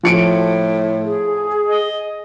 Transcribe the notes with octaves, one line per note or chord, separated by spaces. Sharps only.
A2 F3 C#7 D7
G#4
D#5